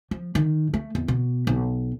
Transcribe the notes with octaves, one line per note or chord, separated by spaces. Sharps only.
F3
D#3
A3
E2
B2
B1